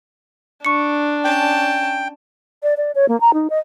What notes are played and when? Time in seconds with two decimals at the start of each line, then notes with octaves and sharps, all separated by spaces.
0.65 D4 C#6 C#7
1.24 C#4 G5 A5
2.63 D5
2.77 D5
2.95 C#5
3.09 A#3
3.21 A#5
3.34 D#4
3.50 D#5